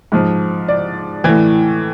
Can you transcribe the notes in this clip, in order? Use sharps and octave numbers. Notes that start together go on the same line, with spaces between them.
G#2 F3
D5
A2 E3